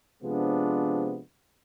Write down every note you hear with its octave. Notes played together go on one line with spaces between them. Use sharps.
C3 F3 G#3 B3 D4